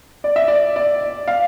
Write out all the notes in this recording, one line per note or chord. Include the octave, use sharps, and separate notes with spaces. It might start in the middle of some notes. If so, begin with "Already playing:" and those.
D5
E5
D5
D5
F5